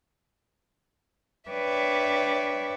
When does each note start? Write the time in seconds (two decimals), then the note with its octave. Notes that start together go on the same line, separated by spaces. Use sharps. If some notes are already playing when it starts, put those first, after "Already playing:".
1.49 D4 B4 C#5 D5 E5 G5